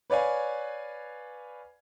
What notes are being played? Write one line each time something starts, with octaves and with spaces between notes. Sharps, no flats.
B4 C#5 D5 F5 G#5